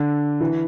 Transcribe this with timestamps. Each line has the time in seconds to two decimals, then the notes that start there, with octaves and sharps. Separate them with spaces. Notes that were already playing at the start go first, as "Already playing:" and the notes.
Already playing: D3
0.41 E3